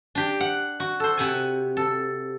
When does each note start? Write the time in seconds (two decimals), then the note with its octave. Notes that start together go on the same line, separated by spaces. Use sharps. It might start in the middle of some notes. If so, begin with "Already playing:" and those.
0.15 D4 G4
0.41 F#5
0.80 F#4
1.00 A4 C5
1.18 C3 F#5 G#5
1.77 A4